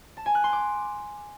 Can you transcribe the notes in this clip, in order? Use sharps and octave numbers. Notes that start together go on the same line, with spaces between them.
A5
G#5
F#6
C6
D6